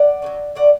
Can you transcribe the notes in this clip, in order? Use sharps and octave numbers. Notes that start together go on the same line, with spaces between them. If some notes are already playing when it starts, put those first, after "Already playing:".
Already playing: D5 F#5
F#3 A3 C#4
A2 D5 F#5